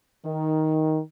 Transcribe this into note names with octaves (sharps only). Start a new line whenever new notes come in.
D#3